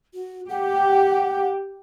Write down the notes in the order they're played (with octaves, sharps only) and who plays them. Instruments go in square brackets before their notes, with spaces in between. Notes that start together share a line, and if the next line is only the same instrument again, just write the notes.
[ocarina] F#4
[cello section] G4 [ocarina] F#5